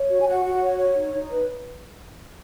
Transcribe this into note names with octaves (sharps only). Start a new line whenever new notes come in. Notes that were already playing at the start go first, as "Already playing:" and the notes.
Already playing: C#5
F#4
G#5
F#4 F#5
F#4
C#5
C#5
D#4
D#4
B4